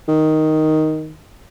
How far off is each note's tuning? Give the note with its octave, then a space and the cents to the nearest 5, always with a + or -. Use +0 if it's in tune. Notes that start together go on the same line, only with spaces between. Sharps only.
D#3 +5